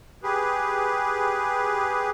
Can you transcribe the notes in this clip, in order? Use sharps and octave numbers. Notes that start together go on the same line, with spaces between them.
G4 G#4 B4